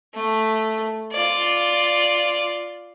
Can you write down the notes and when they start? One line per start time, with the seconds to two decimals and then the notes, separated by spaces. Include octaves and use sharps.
0.14 A3
1.13 F4 D5